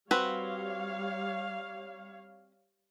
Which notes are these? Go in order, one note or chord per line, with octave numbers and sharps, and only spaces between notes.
G3 C4 F#4 B4 C#5 F5